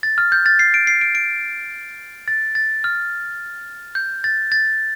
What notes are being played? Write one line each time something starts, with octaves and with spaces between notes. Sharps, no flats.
A6
F6
G6
A6
C7
D7
C7
D7
D7
A6
A6
F6
G6
A6
A6